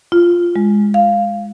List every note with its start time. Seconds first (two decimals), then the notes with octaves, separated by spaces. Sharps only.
0.12 F4
0.56 G#3
0.94 F5